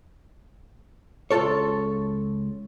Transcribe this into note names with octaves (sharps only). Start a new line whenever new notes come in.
C#2 B2 F4 A4 C#5